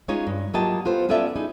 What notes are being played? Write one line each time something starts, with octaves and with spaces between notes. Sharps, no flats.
G#3 C#4 D#4 F4 C#5
G2
F#3 A#3 F4 G4 D#5 A5
B3 F4 A4 C5
B3 C#4 F4 A4 D5 E5
D#4 E4 G#4